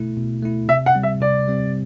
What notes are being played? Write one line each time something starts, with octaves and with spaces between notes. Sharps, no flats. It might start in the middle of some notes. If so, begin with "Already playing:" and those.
Already playing: B2 A3 E4
B2
A3 E4
C3 E5
F#5
G3 C4
E5
C3 D5
G3 C4